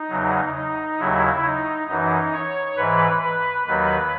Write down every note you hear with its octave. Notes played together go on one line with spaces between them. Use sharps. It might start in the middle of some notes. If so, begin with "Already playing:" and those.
Already playing: D#4
E2 C#3 F#3
D#4
D#2 C#3 F#3 E4
D#4
F#2 E3 D#4
C#5
G#2 E3 B4
B4
D#2 D#3 F#3 B4